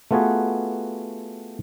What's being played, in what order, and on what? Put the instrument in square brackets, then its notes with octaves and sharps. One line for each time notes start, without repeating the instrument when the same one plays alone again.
[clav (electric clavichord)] A3 B3 F4 F#4 G#4 B4